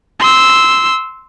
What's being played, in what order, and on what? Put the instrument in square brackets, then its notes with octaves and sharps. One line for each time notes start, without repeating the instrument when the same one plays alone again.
[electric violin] C6 E6